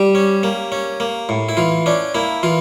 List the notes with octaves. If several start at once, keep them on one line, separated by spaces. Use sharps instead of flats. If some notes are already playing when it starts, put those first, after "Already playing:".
Already playing: G3 G4
C#4
A#3
C#4
A#3
A2
E4
E3 F4
C#4 D4
A#3 E4
E3 F4